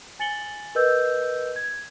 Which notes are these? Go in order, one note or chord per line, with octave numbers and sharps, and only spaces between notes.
G#5 A6 C#7 F#7 G7
A#4 B4 D#5 E6 G6
G#6